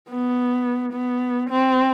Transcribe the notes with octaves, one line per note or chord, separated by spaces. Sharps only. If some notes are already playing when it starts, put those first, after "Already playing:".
B3
B3
C4